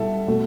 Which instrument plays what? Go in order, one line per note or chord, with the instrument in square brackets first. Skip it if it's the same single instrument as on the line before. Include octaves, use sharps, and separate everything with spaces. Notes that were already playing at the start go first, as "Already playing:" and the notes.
Already playing: [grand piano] B2 G3 E4 A4
B2 A3